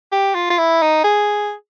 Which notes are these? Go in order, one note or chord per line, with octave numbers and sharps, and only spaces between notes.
G4
F4
F4
E4
D#4
G#4